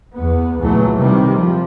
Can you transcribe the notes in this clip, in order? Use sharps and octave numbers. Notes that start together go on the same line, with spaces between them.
E2 B3
C#2 A#2 E3 F#3 A3
C3 D#3 G3
F3